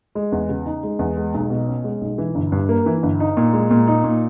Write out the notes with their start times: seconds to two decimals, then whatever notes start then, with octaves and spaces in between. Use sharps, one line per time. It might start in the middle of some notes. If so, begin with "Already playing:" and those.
0.15 G#3
0.32 E2
0.49 C#3
0.66 D#4
0.83 G#3
0.99 E2
1.17 G#3
1.34 B1
1.50 B2
1.67 C#4
1.84 G#3
2.01 B1
2.18 E3
2.35 G1
2.52 G2
2.69 A#3
2.86 E3
3.03 G1
3.20 D#4
3.37 A#2
3.53 G#3
3.71 A#2
3.88 D#4
4.04 A#2